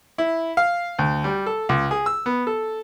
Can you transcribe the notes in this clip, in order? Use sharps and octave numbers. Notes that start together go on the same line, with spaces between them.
E4
F5
D2
G3
A4
C#2
G#4
E6
B3
A4